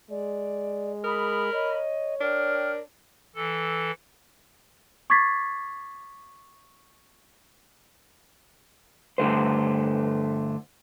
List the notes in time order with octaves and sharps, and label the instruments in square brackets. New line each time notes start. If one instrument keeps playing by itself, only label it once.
[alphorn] G#3 [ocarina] D5
[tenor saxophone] A#4 [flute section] B5 [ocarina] D#6
[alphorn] C#5 [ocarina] D#5
[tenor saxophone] D4 [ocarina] A#4 [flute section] G5 F6
[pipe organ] E3 A4
[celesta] C#6 D6 G#6 A6 B6 C7
[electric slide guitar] G2 D3 A3 C5